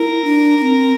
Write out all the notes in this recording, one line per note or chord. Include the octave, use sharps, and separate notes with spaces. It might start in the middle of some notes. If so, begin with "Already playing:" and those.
Already playing: E4 A#4
D4
D4
C4